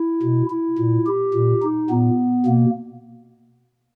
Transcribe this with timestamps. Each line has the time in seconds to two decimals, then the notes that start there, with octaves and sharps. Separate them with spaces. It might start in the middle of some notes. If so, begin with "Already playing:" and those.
Already playing: E4
0.23 B2
0.50 E4
0.78 A#2
1.07 G4
1.34 A#2
1.63 D#4
1.90 A#2 B3
2.46 B2 A#3